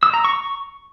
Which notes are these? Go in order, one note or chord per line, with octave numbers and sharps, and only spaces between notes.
E6
A#5
C#6
C#6